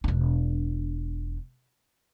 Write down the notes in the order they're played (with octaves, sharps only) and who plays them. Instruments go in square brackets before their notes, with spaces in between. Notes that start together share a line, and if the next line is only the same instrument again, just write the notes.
[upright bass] E1 D4